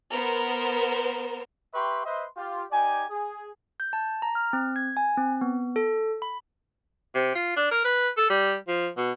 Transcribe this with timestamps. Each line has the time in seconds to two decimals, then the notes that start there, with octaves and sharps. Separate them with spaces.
0.12 B3 A#4 C5
1.74 G4 B4 E5 G5 C6 C#6
2.04 B4 C5 D#5 E5 C6
2.37 F4 G4
2.72 D#4 G4 D5 G#5
3.10 G#4
3.80 G6
3.93 A5
4.22 A#5
4.35 F6
4.53 C4
4.76 G#6
4.97 G#5
5.17 C4
5.41 B3
5.76 A4
6.22 B5
7.15 C3
7.35 F4
7.57 D4
7.71 A#4
7.84 B4
8.17 A4
8.30 G3
8.68 F3
8.97 B2